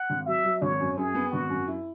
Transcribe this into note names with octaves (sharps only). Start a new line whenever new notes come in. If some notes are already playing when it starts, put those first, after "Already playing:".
Already playing: F#5
G#1
F#3 E5
F#3
G#1 C#5
F#2
F#2 G#4
B3
G#1 F#4
F#2
E4